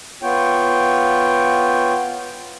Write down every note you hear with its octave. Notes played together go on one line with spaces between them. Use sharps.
B3 F4 C#5 G5